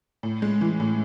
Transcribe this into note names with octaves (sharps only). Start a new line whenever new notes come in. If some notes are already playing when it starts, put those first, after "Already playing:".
A2
G#3
E3
A2